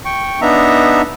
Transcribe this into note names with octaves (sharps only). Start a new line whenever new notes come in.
G5 C#6
B3 D4 D#4 E5 A#5